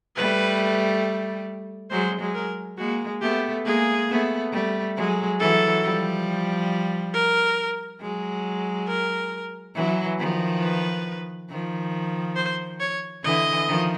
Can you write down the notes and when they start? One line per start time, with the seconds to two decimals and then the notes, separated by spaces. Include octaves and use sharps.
0.17 G3 A3 B4
1.91 F#3 G#3 C5
2.20 F#3 G#3
2.35 A#4
2.78 G#3 A#3 F#4
3.21 A3 B3 G4
3.65 G#3 A#3 G#4
4.09 A3 B3
4.52 G3 A3
4.96 F#3 G#3
5.39 E3 F#3 A4
5.83 F3 G3
7.14 A#4
8.01 F#3 G#3
8.88 A#4
9.75 E3 F#3
10.19 D#3 F3
10.63 B4
11.50 D#3 F3
12.36 C5
12.80 C#5
13.24 D3 E3 D#5
13.67 D#3 F3